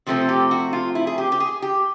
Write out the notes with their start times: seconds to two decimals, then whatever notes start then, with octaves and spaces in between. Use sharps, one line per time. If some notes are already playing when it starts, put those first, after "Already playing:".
0.06 C3 F3 A3 C4
0.29 G4
0.51 F#4
0.73 F4
0.95 E4
1.07 G#4
1.18 G4
1.32 G4
1.40 G#4
1.62 G4